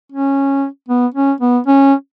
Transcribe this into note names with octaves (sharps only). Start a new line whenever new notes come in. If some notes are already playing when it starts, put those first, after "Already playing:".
C#4
B3
C#4
B3
C#4